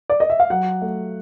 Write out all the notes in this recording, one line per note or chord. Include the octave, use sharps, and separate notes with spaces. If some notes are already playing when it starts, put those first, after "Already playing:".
D5
D#5
E5
F5
F#3 F#5
A3